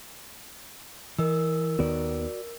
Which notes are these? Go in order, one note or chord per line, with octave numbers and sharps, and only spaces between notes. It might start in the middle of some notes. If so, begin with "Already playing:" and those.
E3 A#4 D#5 E6
D#2 D#3 B3 F#4 D5